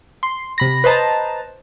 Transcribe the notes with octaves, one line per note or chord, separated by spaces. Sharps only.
C6
C3 B5 A#6
B4 C5 D#5 A5 A#5